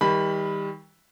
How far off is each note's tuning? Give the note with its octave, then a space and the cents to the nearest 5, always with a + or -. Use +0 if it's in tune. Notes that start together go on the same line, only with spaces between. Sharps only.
D#3 +35 G3 +20 B5 +0